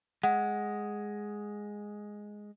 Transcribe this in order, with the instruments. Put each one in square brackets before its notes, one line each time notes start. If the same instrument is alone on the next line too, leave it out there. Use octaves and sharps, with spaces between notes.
[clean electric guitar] G#3 [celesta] F#5